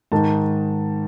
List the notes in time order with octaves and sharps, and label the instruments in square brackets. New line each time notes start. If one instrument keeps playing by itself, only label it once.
[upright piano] G#2 D#3 A5